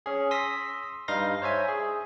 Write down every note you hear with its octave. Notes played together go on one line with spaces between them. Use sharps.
C#4 G#4
C6 D#6 E6 A#6 B6
G2 G3 D#4 F5 C6 A#6
C5 C#5 E5 G#5
G#4